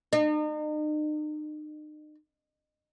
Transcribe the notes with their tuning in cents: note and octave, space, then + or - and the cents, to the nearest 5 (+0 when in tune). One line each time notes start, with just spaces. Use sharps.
D#4 -40